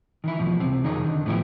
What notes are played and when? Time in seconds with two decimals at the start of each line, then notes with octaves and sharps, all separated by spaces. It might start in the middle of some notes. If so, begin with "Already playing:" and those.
0.24 D#3 E3 E4
0.38 E2 B2 F3
0.60 C#2 C3 C4
0.84 F2 D#3 D#4 G#4 D#5
1.04 D3 D#3
1.26 A2 F3 B3 E4 G4